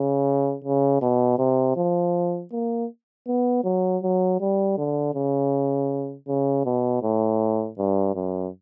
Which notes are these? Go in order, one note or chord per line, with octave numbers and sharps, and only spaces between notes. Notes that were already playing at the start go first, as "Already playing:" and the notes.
Already playing: C#3
C#3
B2
C3
F3
A#3
B3
F#3
F#3
G3
D3
C#3
C#3
B2
A2
G2
F#2